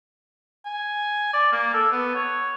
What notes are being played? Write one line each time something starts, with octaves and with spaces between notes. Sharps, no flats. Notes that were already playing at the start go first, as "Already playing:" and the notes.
G#5
D5
A#3
A4
B3
C#5